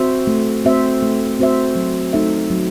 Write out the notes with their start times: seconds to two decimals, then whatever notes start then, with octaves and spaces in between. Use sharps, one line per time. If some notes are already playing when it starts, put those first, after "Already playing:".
Already playing: C4 F#4 C5 E5
0.27 A3
0.65 C4 F#4 C5 E5
1.02 A3
1.39 C4 F#4 C5 E5
1.76 F#3
2.13 A3 D#4 A4 E5
2.51 F#3